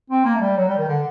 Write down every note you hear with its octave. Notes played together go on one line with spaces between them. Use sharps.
C4
A#3
A3
G3
F#3
G3
D#3
D3